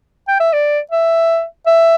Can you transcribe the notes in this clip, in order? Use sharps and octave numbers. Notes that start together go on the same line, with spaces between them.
G5
E5
D5
E5
E5